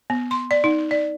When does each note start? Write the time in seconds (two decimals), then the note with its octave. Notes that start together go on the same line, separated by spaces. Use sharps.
0.10 B3
0.31 C6
0.51 D5
0.64 D#4
0.91 D5